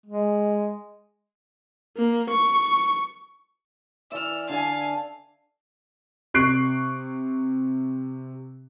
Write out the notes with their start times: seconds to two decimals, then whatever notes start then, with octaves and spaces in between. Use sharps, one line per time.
0.06 G#3
1.97 A#3
2.30 C#6
4.11 E3 D5 E5 E6 F6
4.49 D3 A4 F5 G#5
6.34 C3 C#6 F#6 C7 D7